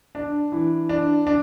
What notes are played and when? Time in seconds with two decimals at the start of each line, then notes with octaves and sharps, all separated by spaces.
0.15 D4
0.52 E3
0.89 D4
1.27 D4